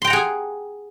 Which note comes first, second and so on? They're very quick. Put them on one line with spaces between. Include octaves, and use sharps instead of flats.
C6 G5 A#5 F#5 G#4